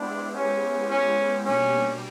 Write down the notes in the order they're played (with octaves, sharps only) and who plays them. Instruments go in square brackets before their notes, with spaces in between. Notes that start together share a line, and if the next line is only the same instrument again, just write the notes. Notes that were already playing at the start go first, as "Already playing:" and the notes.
Already playing: [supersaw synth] G#3 B3 E4 G4 C5 [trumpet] D4
[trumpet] C#4
C#4
[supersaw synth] B2 G3 A#3 D4 G4 [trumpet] C#4